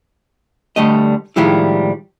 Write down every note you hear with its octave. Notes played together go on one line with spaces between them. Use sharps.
D2 D3 G3 A3 D#5
A2 D#3 F3 G3 G#3 E4